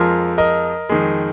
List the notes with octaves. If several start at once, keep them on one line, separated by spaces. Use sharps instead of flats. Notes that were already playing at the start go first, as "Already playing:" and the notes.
Already playing: F2 F3 G#3 F4 A#4
A#4 D#5
F2 D#3 G#3